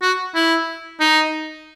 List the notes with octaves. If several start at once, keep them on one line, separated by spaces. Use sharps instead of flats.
F#4
E4
D#4